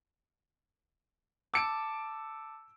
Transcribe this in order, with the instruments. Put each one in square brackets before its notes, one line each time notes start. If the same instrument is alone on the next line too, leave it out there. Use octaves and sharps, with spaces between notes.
[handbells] A5 D6 [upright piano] E6 C#7 D7